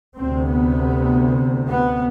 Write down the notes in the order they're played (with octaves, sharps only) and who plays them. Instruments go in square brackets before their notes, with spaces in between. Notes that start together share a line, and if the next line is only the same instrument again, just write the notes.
[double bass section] D2 C3 C4
B3
B3